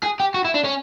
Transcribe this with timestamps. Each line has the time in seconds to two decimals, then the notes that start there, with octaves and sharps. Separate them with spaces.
0.03 G#4
0.20 G4
0.34 F#4
0.45 E4
0.55 D4
0.64 C#4